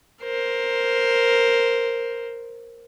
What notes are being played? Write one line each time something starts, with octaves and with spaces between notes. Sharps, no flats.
A#4 C5